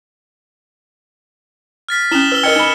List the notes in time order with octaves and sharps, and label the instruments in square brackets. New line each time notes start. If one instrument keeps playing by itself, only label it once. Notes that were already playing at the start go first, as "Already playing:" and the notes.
[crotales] F6 A6 B6
[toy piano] C#4 E4 [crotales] D#6 E7 G7
[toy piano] B4 [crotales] E6 G7
[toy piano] A#4 D#5 G5 [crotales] F6 G#6 C#7
[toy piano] D#4 B5